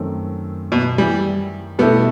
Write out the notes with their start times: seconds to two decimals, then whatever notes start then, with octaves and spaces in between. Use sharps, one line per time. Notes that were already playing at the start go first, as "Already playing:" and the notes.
Already playing: F#2 D#3 A3 C4
0.72 B2
0.98 E3 G3
1.79 B2 G3 A3 B3 E4 A4